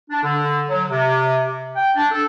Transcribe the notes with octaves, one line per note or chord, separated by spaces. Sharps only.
D4
D3
F#3
C3
G5
D4
A4